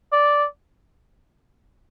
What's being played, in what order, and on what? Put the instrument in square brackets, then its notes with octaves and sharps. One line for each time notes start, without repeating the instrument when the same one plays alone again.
[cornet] D5